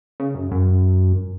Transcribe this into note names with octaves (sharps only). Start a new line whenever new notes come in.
C#3
F#2
F#2